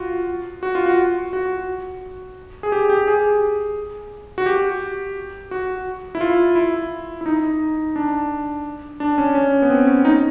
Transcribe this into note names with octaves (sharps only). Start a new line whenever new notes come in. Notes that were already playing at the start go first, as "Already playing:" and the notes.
Already playing: F4 F#4
F#4
F4
F#4
F#4
G#4
G4
G4
G#4
F#4
G4
F#4
E4
F4
E4
E4
D#4
D4
D4
C#4
C#4
B3
C4
C#4
D#4